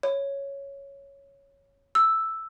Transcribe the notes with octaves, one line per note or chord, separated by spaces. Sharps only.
C#5
E6